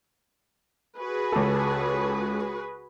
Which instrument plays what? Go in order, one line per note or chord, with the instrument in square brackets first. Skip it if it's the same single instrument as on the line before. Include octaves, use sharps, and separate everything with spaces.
[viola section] F#4 G#4 B4
[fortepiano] C#2 A4